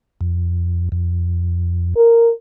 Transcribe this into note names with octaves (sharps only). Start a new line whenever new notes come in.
F2
F2
A#4